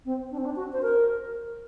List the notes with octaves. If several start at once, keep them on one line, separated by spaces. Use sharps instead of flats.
C4
D4
C4
D4
F#4
C5
A#4